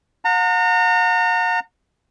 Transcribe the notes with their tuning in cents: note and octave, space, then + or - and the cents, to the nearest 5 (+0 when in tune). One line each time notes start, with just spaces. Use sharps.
F#5 -40 A#5 -35